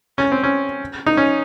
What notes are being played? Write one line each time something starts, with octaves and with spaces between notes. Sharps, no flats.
C#4
C4
C#4
D#4
C#4